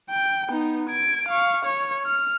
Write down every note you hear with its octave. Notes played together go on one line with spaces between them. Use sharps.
G5
B3 D#4
G#6 D7
F5 C#6
C#5
F6